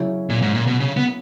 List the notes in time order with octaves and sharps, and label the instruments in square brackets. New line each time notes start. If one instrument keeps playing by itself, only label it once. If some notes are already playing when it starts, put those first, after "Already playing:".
Already playing: [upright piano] C#3 F#3 C#4 E4
[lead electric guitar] A#2
G#2
A#2
B2
C#3
B3